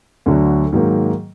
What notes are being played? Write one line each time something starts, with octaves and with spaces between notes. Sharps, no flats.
D2 D3 F#3
G#2 D#3 F#3 A#3